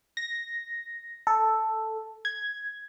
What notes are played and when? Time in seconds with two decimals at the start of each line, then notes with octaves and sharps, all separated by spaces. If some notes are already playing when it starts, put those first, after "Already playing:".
0.17 A#6
1.27 A4
2.25 G#6